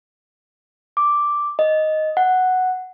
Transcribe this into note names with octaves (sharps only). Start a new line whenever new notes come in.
D6
D#5
F#5